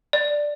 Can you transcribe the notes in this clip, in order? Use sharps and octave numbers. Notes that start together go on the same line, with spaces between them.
D5